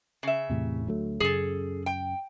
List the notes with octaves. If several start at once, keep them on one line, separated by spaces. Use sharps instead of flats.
C#3 E5
E2 A2 C3
D2 F#3 A3
F#2 C#3 G#4 A4
G5